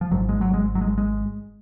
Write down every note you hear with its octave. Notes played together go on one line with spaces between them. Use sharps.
F3
G#1 G#2 F#3
G#3
F#3
G#3
F#3
G#3
G#3